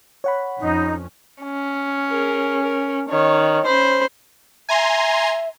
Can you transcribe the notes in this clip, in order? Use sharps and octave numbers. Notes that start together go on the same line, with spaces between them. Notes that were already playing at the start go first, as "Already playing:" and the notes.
C#5 F#5 B5
F2 C#4 D#4
C#4
G#4 A#4
A#4
D#3 C#5
C#4 C5 B5
E5 G#5 A#5 C6